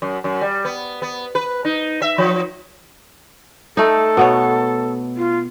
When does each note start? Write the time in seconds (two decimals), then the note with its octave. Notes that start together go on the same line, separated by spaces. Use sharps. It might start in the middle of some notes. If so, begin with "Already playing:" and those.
0.02 F#2
0.24 F#2
0.41 G3
0.65 B3
1.02 B3
1.35 B4
1.65 D#4
2.02 E5
2.18 F3
3.77 A3 D#4 A4
4.17 B2 B3 C#5
5.17 F4